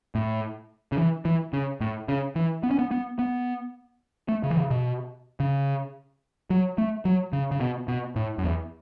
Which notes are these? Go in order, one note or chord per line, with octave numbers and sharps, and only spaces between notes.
A2
C#3
E3
E3
C#3
A2
C#3
E3
B3
C#4
B3
B3
B3
A3
C#3
E3
C#3
B2
C#3
F#3
A3
F#3
C#3
C#3
B2
B2
A2
F#2
E2